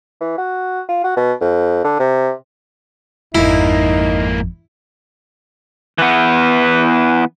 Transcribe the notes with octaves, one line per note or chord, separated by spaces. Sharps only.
E3
F#4
F4
F#4
B2
F2
D3
C3
G#1 F2 G#2 A#3 D#4 E4
E3 B3